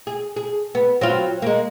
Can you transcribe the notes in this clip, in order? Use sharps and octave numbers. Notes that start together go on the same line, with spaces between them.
G#4
G#4
B3
F#3 C4 F4
G#3 A#3